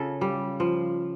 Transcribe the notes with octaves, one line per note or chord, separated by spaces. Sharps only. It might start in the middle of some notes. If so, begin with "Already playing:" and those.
Already playing: C#3 F4 A4
G3
F3